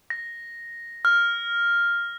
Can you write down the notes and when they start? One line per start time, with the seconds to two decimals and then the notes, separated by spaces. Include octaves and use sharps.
0.10 A#6
1.05 F6